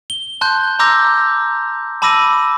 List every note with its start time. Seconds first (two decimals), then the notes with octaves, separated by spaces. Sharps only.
0.10 G7
0.41 A5 C6 F#6 G6
0.79 A#5 C6 D6 E6 G6 A#6
2.02 A5 B5 D6 E6 A#6 D#7